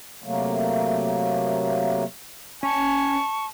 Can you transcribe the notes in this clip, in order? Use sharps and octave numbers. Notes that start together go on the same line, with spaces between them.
C3 F#3 A3 A#3
C#4 G#5 A5 C#6